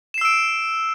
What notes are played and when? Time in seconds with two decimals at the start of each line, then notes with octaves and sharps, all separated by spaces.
0.14 E7
0.18 C7
0.21 E6
0.25 D7